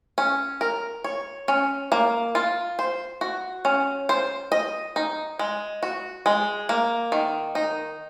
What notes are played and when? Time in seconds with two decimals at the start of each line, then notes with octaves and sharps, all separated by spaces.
0.18 C#4
0.61 A#4
1.04 C#5
1.48 C#4
1.92 A#3
2.35 F4
2.79 C5
3.21 F#4
3.65 C#4
4.09 C5
4.52 D#5
4.96 D#4
5.39 G#3
5.83 F#4
6.26 G#3
6.69 A#3
7.12 D#3
7.55 D#4